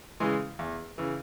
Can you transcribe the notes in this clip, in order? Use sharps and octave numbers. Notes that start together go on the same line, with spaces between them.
C#3 E3 G#3
E2
C#3 E3